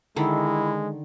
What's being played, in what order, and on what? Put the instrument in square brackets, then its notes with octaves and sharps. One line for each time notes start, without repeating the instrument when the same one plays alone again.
[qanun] D3 D#3 [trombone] G#3 [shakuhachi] E4